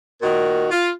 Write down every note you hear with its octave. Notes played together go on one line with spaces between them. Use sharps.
A#2 D#3 F#4
F4